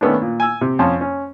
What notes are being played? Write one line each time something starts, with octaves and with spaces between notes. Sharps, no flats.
D#3 A3 B3 C#4 D4
A#2
G#5 E6
C3
F2 C#4 A5 C6
C#4